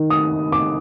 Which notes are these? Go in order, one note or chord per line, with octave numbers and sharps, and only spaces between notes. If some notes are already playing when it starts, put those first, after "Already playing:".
Already playing: D#3
D#6
D6